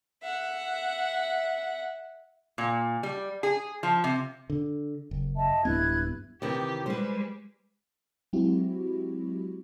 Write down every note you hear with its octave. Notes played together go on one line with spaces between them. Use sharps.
E5 F#5
A#2
G3
G#4
F3
C3
D3
F#1
D#5 E5 A5
D1 G2 B3 E4 F#6 G#6
C3 D#3 E3 G4
G3 G#3 B4 C5
F#3 G#3 C4 E4 F#4 G4